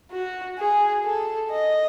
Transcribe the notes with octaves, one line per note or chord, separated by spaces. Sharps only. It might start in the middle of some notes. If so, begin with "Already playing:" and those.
F#4
G#4
A4
D#5